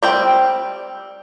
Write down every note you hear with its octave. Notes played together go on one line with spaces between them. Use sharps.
G3 C4 G5